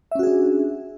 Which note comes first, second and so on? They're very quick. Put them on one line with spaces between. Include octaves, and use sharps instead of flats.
E5 C#4 F#4 G#4 D4